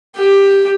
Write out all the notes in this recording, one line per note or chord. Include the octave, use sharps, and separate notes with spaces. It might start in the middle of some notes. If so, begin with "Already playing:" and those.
G4